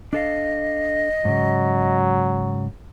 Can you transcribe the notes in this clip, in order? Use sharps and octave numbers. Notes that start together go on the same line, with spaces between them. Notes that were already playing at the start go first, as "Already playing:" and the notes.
D4 A4 D#5 F5
G#2 C#3 F#3